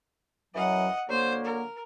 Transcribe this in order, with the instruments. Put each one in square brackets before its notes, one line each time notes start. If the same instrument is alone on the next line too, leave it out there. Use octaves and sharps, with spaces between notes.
[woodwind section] F#2 E3 F#3 [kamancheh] D#5 F#5
[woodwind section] D3 F#3 A#3 [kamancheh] C5
[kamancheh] A#4